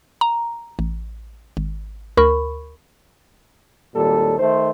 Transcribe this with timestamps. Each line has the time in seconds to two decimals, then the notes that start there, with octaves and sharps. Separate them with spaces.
0.21 A#5
0.79 A1
1.57 G#1
2.17 D2 A#4 B5 C#6
3.95 G#1 D#2 A#2 G3 A4
4.38 D#3 A3 C5